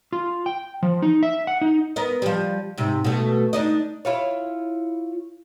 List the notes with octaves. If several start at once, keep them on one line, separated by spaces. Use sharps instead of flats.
F4
G5
F3
D#4
E5
F#5
D#4
B3 A#4 D#5
F3 G3
G#2 C3
B2 A3
D4 D#4 D#5
E4 F4 C#5